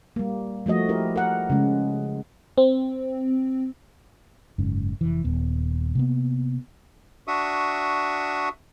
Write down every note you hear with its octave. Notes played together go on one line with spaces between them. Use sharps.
G3 A#3
F3 A3 F#4 D#5
E4 G4 A#4
A#4 F#5
C#3 G#3
C4
F#1 G#2 C#4
F1 E3
D#1 B3
C3 A#3 B3
D4 F#4 E5 C#6 D#6